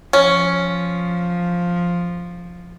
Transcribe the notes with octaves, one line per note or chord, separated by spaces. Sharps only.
F3 C#4